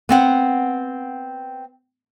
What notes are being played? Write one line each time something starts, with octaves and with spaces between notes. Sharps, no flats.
B3 C4 F#5